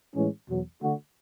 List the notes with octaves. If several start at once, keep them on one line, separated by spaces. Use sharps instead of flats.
A2 E3 G#3 C#4
E2 B2 F#3
D3 A3 D4 F#4